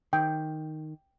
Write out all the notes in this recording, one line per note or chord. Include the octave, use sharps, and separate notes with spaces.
D#3 G5